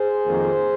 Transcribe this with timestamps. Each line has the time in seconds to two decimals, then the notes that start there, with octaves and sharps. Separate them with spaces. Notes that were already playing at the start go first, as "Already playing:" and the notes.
Already playing: G#4 C5
0.23 F2 D#3 A#3